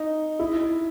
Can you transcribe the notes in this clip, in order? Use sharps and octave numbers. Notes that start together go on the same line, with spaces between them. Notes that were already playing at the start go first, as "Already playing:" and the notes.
Already playing: D#4
E4